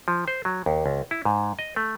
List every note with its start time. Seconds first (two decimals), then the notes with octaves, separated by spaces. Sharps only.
0.08 F3
0.28 C5
0.45 F#3
0.66 D#2
0.86 C#2
1.11 E4
1.25 G#2
1.59 D#5
1.76 A3